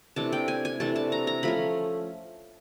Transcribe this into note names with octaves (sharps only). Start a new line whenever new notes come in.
C3 E3 A3 D4 A5
G5
G#5
G#5
C3 E3 A3 D4 A5
A5
A#5
A#5
F3 A3 C#4 B5